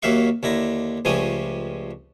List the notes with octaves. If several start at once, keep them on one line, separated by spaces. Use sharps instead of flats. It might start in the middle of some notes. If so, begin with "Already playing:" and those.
D#2 F#3 A#3 E5 F5 C#6
D#2 D3 E4 A#5
C#2 F3 G3 A3 G#5 D#6